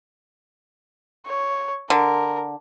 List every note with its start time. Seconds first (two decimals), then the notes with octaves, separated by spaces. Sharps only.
1.27 C#5
1.90 D3 A#4